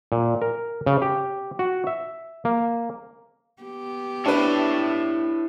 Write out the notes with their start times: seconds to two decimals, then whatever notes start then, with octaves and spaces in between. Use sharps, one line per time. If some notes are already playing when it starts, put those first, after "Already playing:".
0.12 A#2
0.42 A#4
0.86 C#3
1.02 G4
1.59 F#4
1.87 E5
2.45 A#3
3.62 B3 G4
4.25 D4 E4 B4 C#5 A5